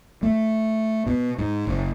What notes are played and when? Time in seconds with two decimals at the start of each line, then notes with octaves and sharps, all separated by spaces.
0.23 A3
1.07 B2
1.38 G#2
1.67 F#1